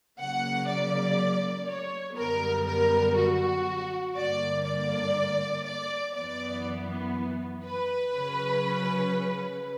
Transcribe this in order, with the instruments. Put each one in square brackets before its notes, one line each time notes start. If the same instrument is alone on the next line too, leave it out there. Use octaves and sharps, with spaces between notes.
[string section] C#3 F#3 A#3 F#5
D5
C#5
F#2 D3 G3 B3 A#4
A#4
F#4
G2 D3 A#3 D5
D5
D5
F#2 E3 B3 D5
B4
C#3 F#3 C#4